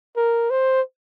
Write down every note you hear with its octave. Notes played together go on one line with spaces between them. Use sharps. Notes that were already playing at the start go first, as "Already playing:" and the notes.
A#4
C5